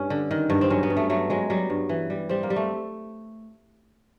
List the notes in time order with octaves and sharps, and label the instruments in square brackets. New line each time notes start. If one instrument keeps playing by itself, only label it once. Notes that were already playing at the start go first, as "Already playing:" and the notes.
Already playing: [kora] G2 C#4
D3
D#3
G2
C4
F#3 C#4
B3
G2
A3
F#3 A3
F#3 G#3
F#3 G3
G2
E3
G3
G3 C4
A#3
G3
A3